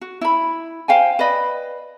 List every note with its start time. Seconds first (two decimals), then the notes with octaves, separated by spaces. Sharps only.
0.01 F#4
0.21 E4 B5
0.88 C5 F5 G5 G#5
1.19 B4 D5 D#5 B5